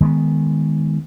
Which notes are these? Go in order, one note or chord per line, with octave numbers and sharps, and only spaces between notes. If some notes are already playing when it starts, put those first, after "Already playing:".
D#3 G#3 A#3 B3